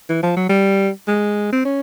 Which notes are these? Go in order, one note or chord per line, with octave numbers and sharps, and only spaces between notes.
E3
F3
F#3
G3
G#3
C4
C#4